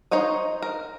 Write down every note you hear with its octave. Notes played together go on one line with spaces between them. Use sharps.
D#4 C5 C#5 D#5
A#4